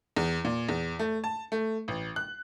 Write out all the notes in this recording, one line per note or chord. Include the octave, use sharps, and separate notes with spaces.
E2
A#2
E2
A3
A5
A3
A1
F#6